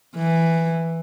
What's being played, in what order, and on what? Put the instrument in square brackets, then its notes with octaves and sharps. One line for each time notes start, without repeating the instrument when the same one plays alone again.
[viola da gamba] E3